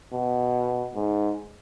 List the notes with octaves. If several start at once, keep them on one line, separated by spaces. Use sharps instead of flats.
B2
G#2